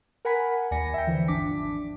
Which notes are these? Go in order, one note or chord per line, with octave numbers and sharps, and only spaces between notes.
A#4 F#5 G#5 B5 B6
D#2 D5 G#5 A#6 C#7
E5 G5
D3 E3 F3
G#1 D4 D6 B6